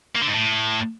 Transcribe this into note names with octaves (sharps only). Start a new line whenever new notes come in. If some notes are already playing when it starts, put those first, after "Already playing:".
A#3
D3
G#2
A2